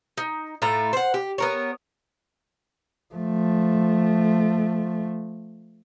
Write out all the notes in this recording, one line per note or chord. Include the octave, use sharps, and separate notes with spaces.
D#4
A2 A3 F4 A#5
C5 F#5
G4
B3 A#4 C#5
F3 A3